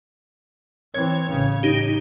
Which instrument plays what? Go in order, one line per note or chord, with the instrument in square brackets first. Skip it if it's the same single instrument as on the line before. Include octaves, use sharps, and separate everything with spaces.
[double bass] E3 C4 [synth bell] C#5 G#6
[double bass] A1 C#3
[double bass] A2 [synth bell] D#4 G4